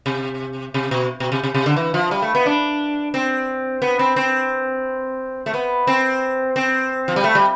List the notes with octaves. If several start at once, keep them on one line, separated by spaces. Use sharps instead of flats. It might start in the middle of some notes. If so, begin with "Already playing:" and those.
C3
C3
B2
B2
C3
C3
C3
D3
E3
F3
G3
A3
B3
D4
C4
B3
C4
C4
A3
B3
C4
C4
F3
G3
A3
G3